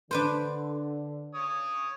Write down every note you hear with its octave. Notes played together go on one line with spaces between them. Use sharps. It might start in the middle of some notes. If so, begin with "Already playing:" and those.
D3 D4 B4 C5
C#5 D#6